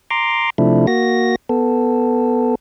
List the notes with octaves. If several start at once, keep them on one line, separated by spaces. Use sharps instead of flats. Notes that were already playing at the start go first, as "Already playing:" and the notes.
A#5 C6 D6
C3 F3 A3 D4 E4
A#3 F#4 A#6
B3 A4